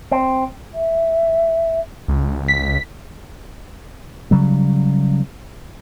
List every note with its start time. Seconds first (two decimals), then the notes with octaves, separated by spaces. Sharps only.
0.11 C4
0.74 E5
2.08 C#2
2.48 B6
4.31 C#3 F#3 G3